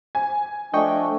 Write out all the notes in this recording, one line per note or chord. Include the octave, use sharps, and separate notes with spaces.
G#5
F3 A3 D4 D#5 G5 C#6